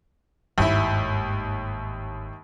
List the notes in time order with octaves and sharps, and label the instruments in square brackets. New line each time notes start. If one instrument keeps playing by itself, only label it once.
[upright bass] G1 G#2 [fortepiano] D#2 E4